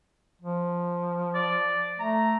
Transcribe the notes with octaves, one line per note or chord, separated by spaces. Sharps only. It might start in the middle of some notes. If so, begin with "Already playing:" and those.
F3
D5
A3 A#5